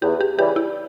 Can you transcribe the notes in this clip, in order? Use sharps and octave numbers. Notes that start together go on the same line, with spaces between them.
E2 G4
G4
C#3 E3 G3 G4
E4